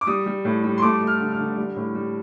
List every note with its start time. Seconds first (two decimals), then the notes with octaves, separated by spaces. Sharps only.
0.01 D6
0.07 G3 D#6
0.26 G3
0.45 A2
0.64 G3
0.78 C6
0.82 A3 D6
1.01 A3
1.07 F6
1.20 D3
1.32 F6
1.39 D3
1.57 G3
1.76 A2
1.95 G3